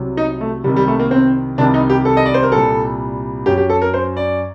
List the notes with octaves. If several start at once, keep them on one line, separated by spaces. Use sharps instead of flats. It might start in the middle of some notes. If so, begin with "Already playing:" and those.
Already playing: C2 C3 F#3
D#4
A3
C2 C3 D#3 G3
G3
A3
A#3
C4
C2 C3 D#3 G3 D4
D#4
G4
A4
D#5
D5
C5
A#4
C2 A#2 G3 A4
F#2 F#3 G4
G4
A4
A#4
C5
D5